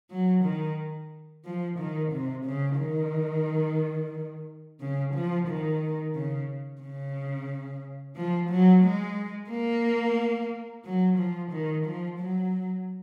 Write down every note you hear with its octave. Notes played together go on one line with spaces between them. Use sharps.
F#3
D#3
F3
D#3
C3
C#3
D#3
C#3
F3
D#3
C#3
C#3
F3
F#3
G#3
A#3
F#3
F3
D#3
F3
F#3